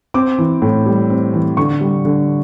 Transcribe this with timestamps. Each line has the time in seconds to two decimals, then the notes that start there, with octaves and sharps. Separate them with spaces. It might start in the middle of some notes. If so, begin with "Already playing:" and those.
0.14 C4 D6
0.38 E3
0.62 A2
0.86 G3
1.10 C4
1.34 E3
1.57 D3 C#6
1.81 G3
2.05 D3